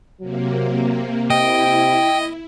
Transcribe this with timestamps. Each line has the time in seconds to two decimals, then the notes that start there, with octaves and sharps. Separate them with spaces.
0.20 C3 F#3 A#3
1.30 C3 E4 D#5 G5